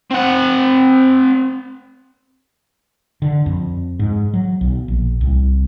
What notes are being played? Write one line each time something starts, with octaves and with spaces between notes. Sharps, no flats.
C4 F#5
D3
F2
G#2
F#3
B1
A#1
C2